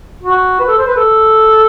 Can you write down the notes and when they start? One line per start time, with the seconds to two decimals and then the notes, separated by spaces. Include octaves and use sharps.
0.23 F#4
0.60 B4
0.68 A4
0.79 C5
0.87 B4
0.96 A4